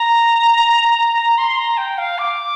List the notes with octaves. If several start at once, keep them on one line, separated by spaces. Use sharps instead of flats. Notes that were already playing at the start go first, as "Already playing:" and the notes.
Already playing: A#5
C6
A#5
G5
F5
D6